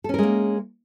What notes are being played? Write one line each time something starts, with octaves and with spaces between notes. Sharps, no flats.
G#3 A#3 C#4 A4 A#4